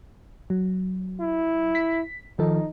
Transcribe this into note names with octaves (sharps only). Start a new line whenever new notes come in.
F#3
E4
B6
D#3 F3 D#4 A4